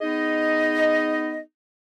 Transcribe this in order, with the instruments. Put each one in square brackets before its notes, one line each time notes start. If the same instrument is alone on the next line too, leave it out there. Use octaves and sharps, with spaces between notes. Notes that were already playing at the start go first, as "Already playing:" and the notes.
[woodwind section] B3 D#4 G#4 D#5